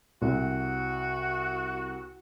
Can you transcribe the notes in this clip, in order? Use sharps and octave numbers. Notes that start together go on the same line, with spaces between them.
C2 F#4